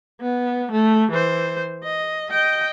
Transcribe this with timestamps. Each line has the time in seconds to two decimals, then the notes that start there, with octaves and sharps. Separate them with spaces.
0.21 B3
0.71 A3
1.11 E3 C5
1.84 D#5
2.30 D#5 G5